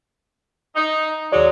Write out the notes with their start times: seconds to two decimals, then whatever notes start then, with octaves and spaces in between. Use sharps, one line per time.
0.75 D#4
1.32 D#2 F#3 G#3 C#5 D5